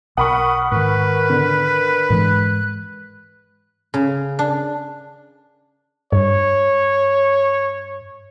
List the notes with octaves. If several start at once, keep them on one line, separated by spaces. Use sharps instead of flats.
B1 A#4 F#5 B5 C#6 D#6
G#2 D#3 B4
D3
G#2 E3 G#3 F#6
C#3
D4
G2 C#5